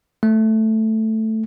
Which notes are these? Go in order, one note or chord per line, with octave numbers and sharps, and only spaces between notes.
A3